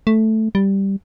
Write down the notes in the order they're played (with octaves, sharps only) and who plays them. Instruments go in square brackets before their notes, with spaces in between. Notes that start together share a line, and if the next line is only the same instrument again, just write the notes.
[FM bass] A3
G3